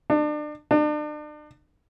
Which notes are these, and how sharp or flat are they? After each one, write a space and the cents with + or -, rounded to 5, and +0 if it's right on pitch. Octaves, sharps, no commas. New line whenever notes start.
D4 +35
D4 +40